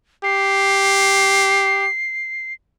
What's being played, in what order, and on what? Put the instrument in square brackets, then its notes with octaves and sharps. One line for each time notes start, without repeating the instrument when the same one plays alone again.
[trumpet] G4 [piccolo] C7